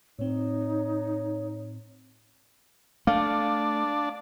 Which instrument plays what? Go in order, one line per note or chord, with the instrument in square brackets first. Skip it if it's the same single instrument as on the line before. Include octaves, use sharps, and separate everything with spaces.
[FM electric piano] A2 C4 [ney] D#4 [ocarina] C#5
[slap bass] A3 [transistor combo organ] D4 D5 [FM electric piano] F5